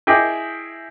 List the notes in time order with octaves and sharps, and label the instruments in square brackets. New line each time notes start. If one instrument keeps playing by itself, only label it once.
[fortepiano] E4 G#4 D#5 G5 D6